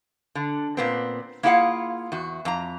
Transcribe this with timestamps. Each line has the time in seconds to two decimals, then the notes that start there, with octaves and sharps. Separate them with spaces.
0.35 D3
0.77 A#2 B3 C4
1.43 A#3 E4 F4 G#4 F5 F#5
2.12 E2 F#4
2.45 F2 A#5